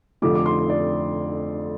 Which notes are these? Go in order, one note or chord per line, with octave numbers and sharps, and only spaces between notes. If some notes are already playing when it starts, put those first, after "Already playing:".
F1 F2 D3 F3 D6
D6
C6
D5